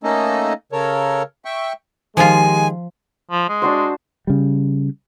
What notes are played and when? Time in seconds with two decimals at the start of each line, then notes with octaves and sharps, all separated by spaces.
0.03 A3 A#3 C#4 D#4 A4 D#5
0.72 C#3 A4 A#4 C#5
1.45 E5 G5 C#6
2.17 D#3 F3 G#3 F4 G4 G#5
3.31 F3
3.49 G#3
3.62 D4 F#4 C5
4.27 C#3 G3